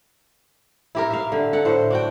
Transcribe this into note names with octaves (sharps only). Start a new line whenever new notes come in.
E4 G4 A#4
E5 F5
D3
A4 F#5
A2 C5
D4 F#4 G5